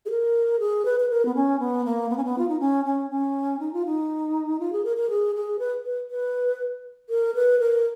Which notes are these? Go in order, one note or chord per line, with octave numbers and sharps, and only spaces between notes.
G#4
A#4
G#4
B4
B4
A#4
B3
C#4
B3
A#3
B3
C#4
B3
F4
D#4
C#4
C#4
C#4
D#4
F4
D#4
F4
G#4
A#4
A#4
G#4
G#4
B4
B4
B4
A#4
B4
A#4